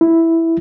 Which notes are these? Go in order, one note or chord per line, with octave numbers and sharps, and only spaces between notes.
E4